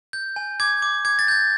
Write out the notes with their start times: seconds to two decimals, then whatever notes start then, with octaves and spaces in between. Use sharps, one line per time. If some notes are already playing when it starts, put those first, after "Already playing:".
0.13 G6
0.36 G#5
0.60 D6 G#6
0.82 D6
1.05 D6 G#6
1.19 A6
1.28 G6 G#6